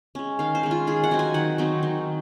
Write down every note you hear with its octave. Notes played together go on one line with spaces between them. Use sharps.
G#3 C#4
D#3 F5
C5
G#3 C#4
F4
D#3 G#4
F#5
F#3 C4 D#4
G#5
D#3 F#5
F#3 C4 D#4
D#3